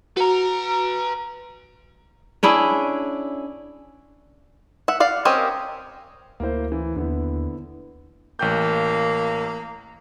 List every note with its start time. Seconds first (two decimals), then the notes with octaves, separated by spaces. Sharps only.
0.17 F#4 B4 A#5
2.43 C#4 D4 E4 G#4
4.88 E5 F#5
5.00 D5 F5 F#5
5.25 C4 C#4 G4 A#4 D#5
6.40 D2 A#3 E4 C5
6.72 E3
6.96 D#2 D3 B3 E4
8.39 A1 A#3 G5 G6